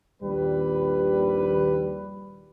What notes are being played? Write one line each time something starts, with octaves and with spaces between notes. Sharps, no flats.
A#1 D#2 G3 B4